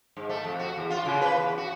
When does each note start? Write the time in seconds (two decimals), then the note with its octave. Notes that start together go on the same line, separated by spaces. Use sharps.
0.17 G#2
0.29 A3
0.44 F2
0.59 F#4
0.76 E2
0.90 F4
1.06 C#3
1.21 B4
1.37 E2
1.58 F#4